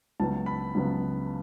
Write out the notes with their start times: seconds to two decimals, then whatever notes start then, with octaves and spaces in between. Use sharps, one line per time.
0.20 C#2 C#3 F#3 B3 A5
0.46 B5
0.75 C#2 C#3 F#3 B3